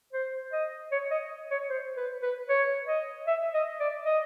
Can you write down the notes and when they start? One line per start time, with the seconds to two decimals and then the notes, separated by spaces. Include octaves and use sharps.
0.13 C5
0.52 D#5
0.92 C#5
1.11 D#5
1.51 C#5
1.70 C5
1.97 B4
2.22 B4
2.49 C#5
2.87 D#5
3.27 E5
3.54 D#5
3.80 D5
4.06 D#5